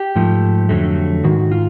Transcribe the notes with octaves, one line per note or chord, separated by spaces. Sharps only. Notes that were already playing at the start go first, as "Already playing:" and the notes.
Already playing: G4
G#2 F3 A3
F2 D3 F#3 A3
G#2 D#3 F#4
F4